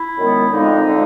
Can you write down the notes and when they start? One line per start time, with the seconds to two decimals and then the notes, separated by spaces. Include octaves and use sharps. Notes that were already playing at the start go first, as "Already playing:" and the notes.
Already playing: E4
0.15 F#2 D#3 G#3 B3
0.51 D3 F3 G#3 C4 D#4
0.87 D3 F3 G#3